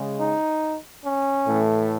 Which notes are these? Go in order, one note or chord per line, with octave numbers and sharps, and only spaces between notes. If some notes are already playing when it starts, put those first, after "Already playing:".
Already playing: C#3 G#3
D#4
C#4
A2 E3 A3